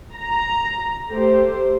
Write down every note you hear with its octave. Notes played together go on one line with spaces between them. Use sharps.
A#5
A3 G4 C5